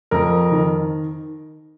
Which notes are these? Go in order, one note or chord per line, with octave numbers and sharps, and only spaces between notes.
F2 A#4
D#3